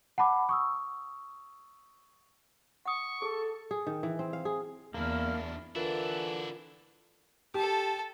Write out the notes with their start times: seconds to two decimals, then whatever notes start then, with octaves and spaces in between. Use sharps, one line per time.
0.18 F#5 A5 B5 D6
0.49 C#6 D#6 E6
2.86 F#5 C#6 D#6
3.22 G#4 A4
3.71 G#4
3.87 D#3
4.03 E3
4.19 C4
4.33 F5
4.45 G#4
4.94 E2 A#3 D4 E4 F6
5.76 D3 E3 D4 E4 F4 A#4 A6
7.54 G4 A4 A5